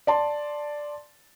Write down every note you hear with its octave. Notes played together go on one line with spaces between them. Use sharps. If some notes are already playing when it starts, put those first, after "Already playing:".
D5 A5 C6